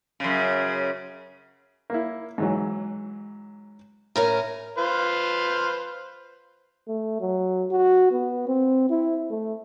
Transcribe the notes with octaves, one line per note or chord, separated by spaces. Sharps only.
F#2 C#3
A#3 E4
G#2 E3 F#3
A2 C#4 A#4 A#5
F4 B4 C5
A3
F#3
F#4
B3
C4
E4
A3